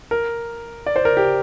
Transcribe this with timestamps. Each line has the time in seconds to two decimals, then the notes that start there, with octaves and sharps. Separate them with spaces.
0.11 A#4
0.86 D5
0.96 C5
1.05 A#4
1.17 G4